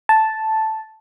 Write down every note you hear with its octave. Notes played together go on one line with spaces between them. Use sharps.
A5